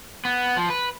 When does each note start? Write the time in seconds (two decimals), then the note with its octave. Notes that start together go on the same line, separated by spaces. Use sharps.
0.25 B3
0.57 F3
0.70 B4